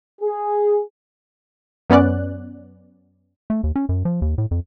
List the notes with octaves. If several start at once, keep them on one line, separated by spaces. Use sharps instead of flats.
G#4
F#2 B3 C#4 D5 F#6
A3
D#2
C#4
F#2
F3
D#2
A2
F2